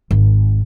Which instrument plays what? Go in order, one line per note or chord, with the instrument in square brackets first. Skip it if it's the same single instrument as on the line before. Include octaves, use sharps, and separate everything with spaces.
[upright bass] G#1